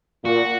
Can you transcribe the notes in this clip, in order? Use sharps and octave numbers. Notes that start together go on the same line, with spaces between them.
A#2 F#4